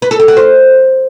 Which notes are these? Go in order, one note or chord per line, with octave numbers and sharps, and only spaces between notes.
B4
A4
G4
F#4
C5